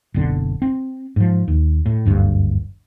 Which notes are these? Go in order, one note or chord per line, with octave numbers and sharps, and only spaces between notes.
F#1 B1 D3
C4
G#2 F3
D#2
A2
F#1 D2 G2